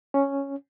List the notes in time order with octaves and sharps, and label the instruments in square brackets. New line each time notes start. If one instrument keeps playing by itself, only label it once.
[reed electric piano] C#4